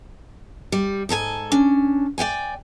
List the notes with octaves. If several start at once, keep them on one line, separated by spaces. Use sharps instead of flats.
G3
G#2 A4 B4 G#5
C#4 D4
D5 D#5 G5 G#5